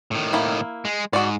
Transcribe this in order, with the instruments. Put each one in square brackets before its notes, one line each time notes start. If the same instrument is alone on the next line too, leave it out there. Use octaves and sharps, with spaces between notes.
[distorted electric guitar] A2 D#3
[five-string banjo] A#3 E4
[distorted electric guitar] G#3
[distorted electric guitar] G#2 [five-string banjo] F#4 D5